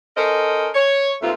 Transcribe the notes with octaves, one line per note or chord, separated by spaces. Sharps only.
C#4 A4 A#4 C5 D#5
C#5
D#2 A3 C4 F4 B4